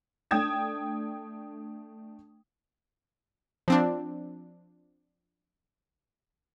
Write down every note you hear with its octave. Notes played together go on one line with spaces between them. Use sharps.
A3 D4 G5 D#6 G#6 E7
F3 C4 D4